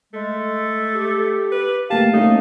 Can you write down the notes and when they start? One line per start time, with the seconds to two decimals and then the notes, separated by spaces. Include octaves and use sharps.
0.14 G#3 A3
0.93 G4
1.52 B4
1.90 A3 A#3 G4 F5 A5
2.14 A3 A#3 C#4 D#4